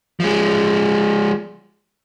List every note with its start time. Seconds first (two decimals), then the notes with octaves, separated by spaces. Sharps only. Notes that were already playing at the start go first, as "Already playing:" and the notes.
0.20 F3 G#3